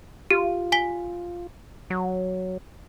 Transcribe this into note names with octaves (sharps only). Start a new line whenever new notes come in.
F4 G4
G#5 B6 G7
F#3